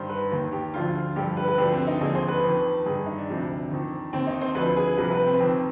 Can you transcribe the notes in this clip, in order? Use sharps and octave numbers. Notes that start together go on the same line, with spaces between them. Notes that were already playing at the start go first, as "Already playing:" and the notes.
Already playing: G2 D#3 C5
B4
D#2 D#3
G4
D2 D3 F3 F4
F4
G2 D3 F3 G4
B4
B4
D2 D3 F3 G4
C4
D#4
D#2 D3 F3 G#4
C5
B4
F2 D#3
G2 D#3 G#4
D#4
D4
D2 C3 F3
F2 D#3
D#2 D#3 C4
D#4
C5
D2 D3 F3 B4
G#4
C2 C3 F3 B4
B4
C4
F2 D#3 C4